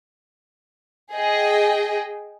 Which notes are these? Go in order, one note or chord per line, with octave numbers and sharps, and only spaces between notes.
G#4 D#5 G5